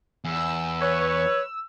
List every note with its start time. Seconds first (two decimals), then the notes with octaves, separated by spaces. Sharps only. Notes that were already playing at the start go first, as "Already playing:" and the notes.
0.25 E2 E6
0.81 B4 C#5